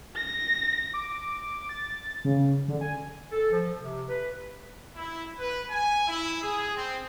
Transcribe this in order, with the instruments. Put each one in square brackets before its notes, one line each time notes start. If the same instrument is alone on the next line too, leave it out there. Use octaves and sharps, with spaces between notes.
[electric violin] A#6
[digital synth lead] D6
A6
C#3
D3
G#5
[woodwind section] A4
F3
C3
B4
[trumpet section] E4
B4
G#5
E4
G#4
C4